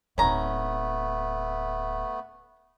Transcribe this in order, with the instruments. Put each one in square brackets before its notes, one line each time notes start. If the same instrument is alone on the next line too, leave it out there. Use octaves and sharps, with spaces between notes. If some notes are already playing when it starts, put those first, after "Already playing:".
[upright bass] D1 D#4 [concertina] A3 B3 [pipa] C#4 A#5